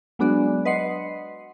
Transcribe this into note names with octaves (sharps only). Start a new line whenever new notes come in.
F#3 G#3 B3 D4 F#4 D5
B4 D#5 F#5 C6 C7 C#7